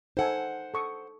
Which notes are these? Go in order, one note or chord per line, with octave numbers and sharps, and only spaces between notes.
D#4 A4 C5 F#5 G#5
A4 C#6 D#6